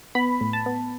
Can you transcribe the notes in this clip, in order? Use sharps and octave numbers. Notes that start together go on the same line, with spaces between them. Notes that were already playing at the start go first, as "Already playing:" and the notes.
B3 B5
A2
A5
B3